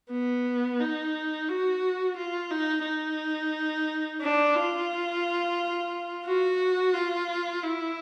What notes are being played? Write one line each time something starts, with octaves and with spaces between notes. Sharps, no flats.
B3
D#4
F#4
F4
D#4
D#4
D4
F4
F#4
F4
E4